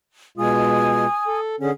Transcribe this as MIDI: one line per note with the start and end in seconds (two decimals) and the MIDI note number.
0.37 1.06 47
0.37 1.06 56
0.37 1.06 65
0.37 1.38 80
0.37 1.38 87
1.27 1.56 69
1.60 1.71 50
1.60 1.71 61
1.60 1.70 68